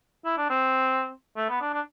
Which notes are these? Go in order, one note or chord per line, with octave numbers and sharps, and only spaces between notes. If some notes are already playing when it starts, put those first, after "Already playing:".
E4
D4
C4
A3
B3
D4
D4